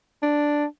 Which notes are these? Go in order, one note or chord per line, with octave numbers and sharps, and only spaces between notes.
D4